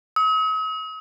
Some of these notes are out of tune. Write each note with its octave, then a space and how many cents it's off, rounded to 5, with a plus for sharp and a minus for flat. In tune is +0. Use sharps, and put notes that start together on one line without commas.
D#6 +45